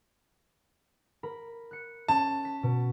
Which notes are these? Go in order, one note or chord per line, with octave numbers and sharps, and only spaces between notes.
A#4 B5
F#6 C#7
C#4 A5
B6
B2